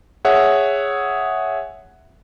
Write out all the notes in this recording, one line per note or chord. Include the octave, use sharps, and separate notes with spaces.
G#4 C#5 E5 F#5